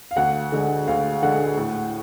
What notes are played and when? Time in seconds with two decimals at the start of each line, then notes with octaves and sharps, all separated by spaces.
0.11 F5
0.16 D2 F#5
0.52 D3 G#3
0.87 D2 F5
1.23 D3 G#3 F#5
1.58 A2